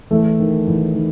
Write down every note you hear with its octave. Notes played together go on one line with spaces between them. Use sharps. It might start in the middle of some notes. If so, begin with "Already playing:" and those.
E2 A3 A4
D#3
E2
D#3